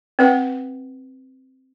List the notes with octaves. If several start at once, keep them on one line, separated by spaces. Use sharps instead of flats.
C4 B4 F#5